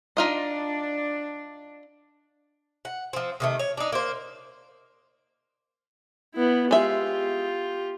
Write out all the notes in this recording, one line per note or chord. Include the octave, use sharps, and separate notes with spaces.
D4 D#4 F4 D#5
F#5
F3 C4
C3 D#3 A3
C#5
D4 D#4
A#3 C5
B3 E4
G#3 F4 G4 E5